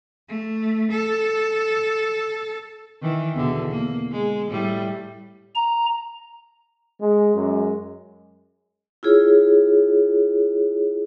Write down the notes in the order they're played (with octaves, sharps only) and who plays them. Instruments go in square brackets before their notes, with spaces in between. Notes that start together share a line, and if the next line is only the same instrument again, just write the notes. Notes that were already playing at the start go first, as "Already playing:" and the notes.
[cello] A3
A4
[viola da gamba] D#3 E3
E2 B2 D3
A#3
G#3
A2 G3
[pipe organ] A#5
[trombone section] G#3
F#2 G#3
[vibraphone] E4 F4 G#4 C#5